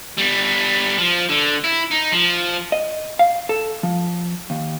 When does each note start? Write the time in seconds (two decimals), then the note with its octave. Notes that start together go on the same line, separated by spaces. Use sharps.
0.18 G3 B3
0.98 F3
1.29 D3
1.64 E4
1.91 D#4
2.12 F3
2.72 D#5
3.19 F5
3.49 A4
3.83 F3
4.50 D#2